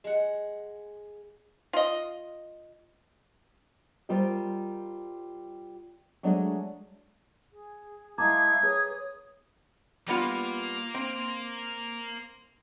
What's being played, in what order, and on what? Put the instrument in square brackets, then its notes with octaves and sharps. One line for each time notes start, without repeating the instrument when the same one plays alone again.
[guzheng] G#3 F#5
[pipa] F4 D#5
[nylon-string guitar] G3 F4 A#4 C5 D#5
F#3 G#3 A3 D4 D5 D#5
[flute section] G#4
[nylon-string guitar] G#3 A5 [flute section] E4 F5 D#6 [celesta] A#5 D6 [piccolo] G#6
[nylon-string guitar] G#4 B4 [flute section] C#5 D#6
[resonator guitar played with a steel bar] G3 B3 F4 [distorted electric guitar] A#3
[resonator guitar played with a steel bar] C4